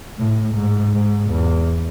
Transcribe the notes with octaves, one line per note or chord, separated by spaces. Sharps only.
A2
G#2
G#2
E2